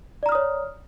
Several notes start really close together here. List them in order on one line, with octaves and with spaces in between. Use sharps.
D5 A#5 F6 D#6 C#5